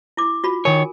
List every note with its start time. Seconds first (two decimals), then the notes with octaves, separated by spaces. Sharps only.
0.17 E4 D6
0.44 F4 F#4 B5
0.65 D#3 A#4 C#5 G#5